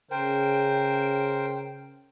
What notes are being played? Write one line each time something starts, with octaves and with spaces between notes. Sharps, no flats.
C#3 A#4 C5 G5